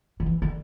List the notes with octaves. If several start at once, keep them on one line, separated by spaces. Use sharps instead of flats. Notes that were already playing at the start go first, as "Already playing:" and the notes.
D3
E3
D3